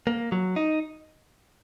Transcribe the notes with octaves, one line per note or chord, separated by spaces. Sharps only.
A#3
F#3
D#4